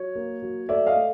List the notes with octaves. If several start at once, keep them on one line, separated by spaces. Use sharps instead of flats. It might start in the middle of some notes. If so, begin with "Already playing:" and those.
Already playing: F#3 C#5
A#3
F#3
A3 D5 E5
D#5 F5
A3